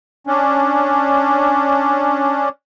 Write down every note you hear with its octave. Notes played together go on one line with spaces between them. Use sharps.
C#4 D4